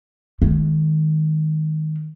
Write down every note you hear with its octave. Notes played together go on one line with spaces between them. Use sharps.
D#3 G#3